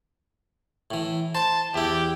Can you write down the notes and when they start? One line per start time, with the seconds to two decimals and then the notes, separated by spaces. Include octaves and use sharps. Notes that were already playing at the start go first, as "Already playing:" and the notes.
0.91 A2 E3
1.35 C5 A5
1.74 E2 E4 G4